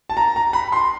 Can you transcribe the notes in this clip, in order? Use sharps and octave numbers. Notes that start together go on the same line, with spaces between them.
A5
A#5
A#5
B5
C6